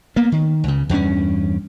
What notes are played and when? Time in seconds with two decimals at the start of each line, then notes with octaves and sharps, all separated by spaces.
0.16 A#3 B3
0.32 D#3
0.64 C#2 C#3
0.89 E2 G2 A#3 C#4